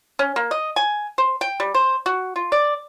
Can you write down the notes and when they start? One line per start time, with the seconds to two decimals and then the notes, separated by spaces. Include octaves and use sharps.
0.19 C#4
0.36 A#3
0.51 D#5
0.76 G#5
1.18 C5
1.41 G5
1.60 G3
1.74 C5
2.06 F#4
2.36 F4
2.52 D5